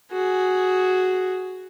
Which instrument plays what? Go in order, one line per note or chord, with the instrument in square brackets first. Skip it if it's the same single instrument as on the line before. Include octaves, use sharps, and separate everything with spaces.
[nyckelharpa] F#4 G#4